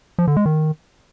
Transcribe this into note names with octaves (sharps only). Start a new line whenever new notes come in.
F3
D3
G#3
D#3